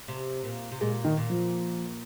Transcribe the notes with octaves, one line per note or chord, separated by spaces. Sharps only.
C3
A#2
C3
A#2 G#3
D#3
A#2
F3